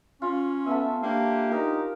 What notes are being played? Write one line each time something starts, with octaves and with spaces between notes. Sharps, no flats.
C#4 F4
A3 B3 B4 E5 G#5
A#3 D4 G4
D#4 A#4